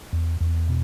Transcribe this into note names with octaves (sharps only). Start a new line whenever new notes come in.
E2
E2
B2